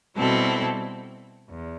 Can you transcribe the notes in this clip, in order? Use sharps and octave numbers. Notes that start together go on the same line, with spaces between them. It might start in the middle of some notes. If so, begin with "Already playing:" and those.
B2 G3 C4 E4 A4
E2